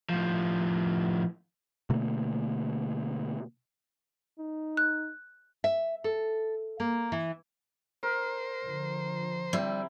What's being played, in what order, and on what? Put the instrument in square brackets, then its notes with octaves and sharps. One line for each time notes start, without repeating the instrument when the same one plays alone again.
[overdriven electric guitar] A2 F3
[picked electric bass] B2 D3 A3 A#3
[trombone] D#4
[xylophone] F#6
[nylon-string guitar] E5
A4
A#3
E3
[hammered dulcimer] A#4 [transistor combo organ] C5
[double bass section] D3 F3
[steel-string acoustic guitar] G3 [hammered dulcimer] C4 E4